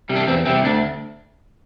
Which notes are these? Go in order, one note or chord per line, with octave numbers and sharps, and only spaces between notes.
C3 G3
D4
E2 C4
C3 G3 C4
D2 D4